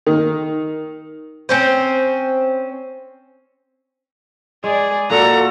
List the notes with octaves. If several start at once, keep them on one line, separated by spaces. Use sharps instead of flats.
D#3
C4 C#4 C5
G#3 G#4 D5
A#2 A#3 F#4 A4 F#5 A#5